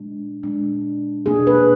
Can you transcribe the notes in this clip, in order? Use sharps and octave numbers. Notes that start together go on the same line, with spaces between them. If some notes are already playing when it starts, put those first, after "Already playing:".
Already playing: A#2 G#3 D4
A#2 G#3 D4
B2 A#3 D4 G#4
B4